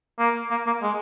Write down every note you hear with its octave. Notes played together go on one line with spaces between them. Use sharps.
A#3
A#3
A#3
G#3